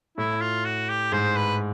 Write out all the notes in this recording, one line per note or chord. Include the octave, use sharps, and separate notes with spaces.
A2 E4
F4
F#4
G4
G#2 C5
B4